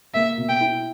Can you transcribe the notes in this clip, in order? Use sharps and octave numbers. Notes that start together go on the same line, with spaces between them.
A#3 E5
B2
G5
E4